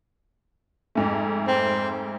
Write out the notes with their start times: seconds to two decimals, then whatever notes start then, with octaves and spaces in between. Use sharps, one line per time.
0.95 F2 G#2 A3
1.48 C4